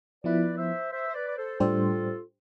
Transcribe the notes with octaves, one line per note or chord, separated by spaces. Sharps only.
F3 B3 E4 B4 D5
C5 E5
C5 E5
C5
B4 D5
D5
A4 C5
A2 G3 D4 F4 G4 A4 C5